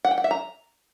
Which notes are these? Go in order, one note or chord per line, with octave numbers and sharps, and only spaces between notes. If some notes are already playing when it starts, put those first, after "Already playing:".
F#5
G5
F#5
E5
A#5